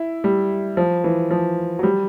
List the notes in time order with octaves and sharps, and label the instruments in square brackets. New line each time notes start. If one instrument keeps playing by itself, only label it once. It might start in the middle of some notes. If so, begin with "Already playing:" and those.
Already playing: [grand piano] E4
G3
F3
E3
F3
F#3
G3